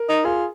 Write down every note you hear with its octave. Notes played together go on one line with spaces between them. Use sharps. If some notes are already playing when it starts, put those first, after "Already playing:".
Already playing: A#4
D#4
F4 G#4